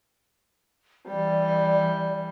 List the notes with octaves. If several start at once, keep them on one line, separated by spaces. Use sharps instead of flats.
E3 G3 D5